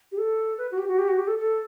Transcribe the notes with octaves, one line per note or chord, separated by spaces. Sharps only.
G4
A4
B4
F#4
G4
F#4
G4
F#4
G4
A4
A4